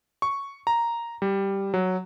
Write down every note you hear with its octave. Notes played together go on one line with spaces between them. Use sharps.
C#6
A#5
G3
F#3